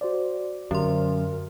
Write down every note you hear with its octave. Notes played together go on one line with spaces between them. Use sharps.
F#4 C5 D5
F#2 D3 A#4 C6